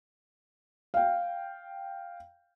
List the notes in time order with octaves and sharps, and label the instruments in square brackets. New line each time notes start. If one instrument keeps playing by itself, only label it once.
[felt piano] F5 G5